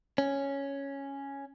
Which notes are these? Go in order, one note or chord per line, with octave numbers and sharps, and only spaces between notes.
C#4